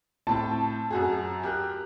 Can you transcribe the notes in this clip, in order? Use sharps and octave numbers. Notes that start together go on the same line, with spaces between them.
A2 C4 A5
F#2 F#4 G#4
G4 A#4 F#6